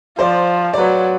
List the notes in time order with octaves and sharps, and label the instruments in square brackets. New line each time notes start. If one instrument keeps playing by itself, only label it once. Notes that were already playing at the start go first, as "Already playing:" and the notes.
[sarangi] F3 [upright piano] C5 D5
[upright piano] D5
[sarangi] F#3 [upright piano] B4 C#5